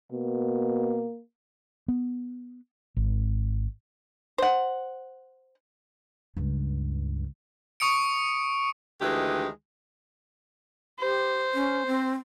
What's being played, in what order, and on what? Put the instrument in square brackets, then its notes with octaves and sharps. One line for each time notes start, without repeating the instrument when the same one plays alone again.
[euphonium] B2 [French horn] A#3
[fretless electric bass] B3
G#1
[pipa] C5 F#5
[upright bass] C#2 G2
[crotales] C#6 D#6 C#7 D7
[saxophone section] D2 D#3 E3 G#3 G4
[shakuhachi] G4 [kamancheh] C5
[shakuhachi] C#4
C4